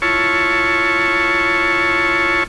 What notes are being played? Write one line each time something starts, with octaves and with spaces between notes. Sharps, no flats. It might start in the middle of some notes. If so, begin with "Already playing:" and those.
E4 F4 C#5 A5 C#6